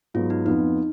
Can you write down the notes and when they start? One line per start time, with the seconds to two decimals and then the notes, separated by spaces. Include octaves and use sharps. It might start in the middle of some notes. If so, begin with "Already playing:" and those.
0.14 G#2 F#3 B3 F4
0.30 D#4
0.46 F2 F3 B3 D#4 F4